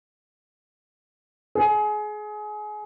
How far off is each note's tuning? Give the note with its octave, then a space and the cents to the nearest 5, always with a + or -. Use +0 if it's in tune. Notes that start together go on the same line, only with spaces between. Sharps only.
G#4 +25